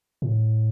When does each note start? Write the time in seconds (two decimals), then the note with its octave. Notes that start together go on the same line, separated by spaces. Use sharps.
0.22 A2